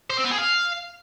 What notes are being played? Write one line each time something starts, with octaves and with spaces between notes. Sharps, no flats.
C5
C4
B3
G#4
F5